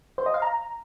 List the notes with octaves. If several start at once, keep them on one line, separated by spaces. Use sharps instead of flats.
C5
D#5
F5
A#5